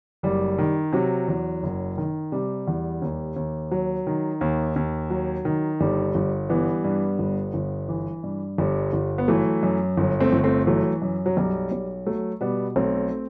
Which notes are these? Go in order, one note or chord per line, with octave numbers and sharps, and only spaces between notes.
F#1 G3
D#3
C3 F#3
E2
F#1
D#3
C3 G3
E2
D#2
D#2
F#3
D#3
D#2
D#2
F#3
D#3
G1 G3
G1
E3 G3 B3
G2
G1
G1
E3
G2
G1 G3
G1
B3
E3 F#3 A3
F#2
G1
A3 C4
G1
A3 C4
E3 F#3 A3
F#2
F#3
B1 G3
B1
F#3 A3
B2 G3 B3
B1 A3 C4